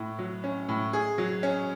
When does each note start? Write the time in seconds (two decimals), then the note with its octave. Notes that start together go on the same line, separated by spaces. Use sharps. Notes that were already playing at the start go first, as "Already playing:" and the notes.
Already playing: A2
0.19 F#3
0.44 C#4
0.69 A2
0.93 G#4
1.18 F#3
1.43 C#4